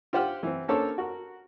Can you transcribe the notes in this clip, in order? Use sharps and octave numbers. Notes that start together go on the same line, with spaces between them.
F4 G4 C5 F#5 G5 F6
E3 C4
A#3 C#4 D4 A4 C5 C#5
F#4 A#4